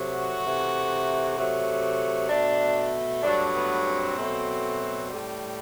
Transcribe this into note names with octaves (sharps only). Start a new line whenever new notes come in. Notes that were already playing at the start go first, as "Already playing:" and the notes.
Already playing: C3 F#3 A3
F#4
C3 E3 A3
C3 F#3 A3
B2 A3 D4
G2 F#3 A3 D4
B3
C4
B2 F#3 A3
A2 G3